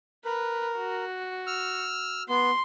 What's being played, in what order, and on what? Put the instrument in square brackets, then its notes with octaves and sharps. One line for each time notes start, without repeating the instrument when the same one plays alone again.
[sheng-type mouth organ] A#4 [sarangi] B4
[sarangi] F#4
[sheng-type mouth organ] E6 F6
[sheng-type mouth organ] B3 [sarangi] C6